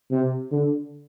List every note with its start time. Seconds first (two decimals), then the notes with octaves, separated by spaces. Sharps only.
0.11 C3
0.52 D3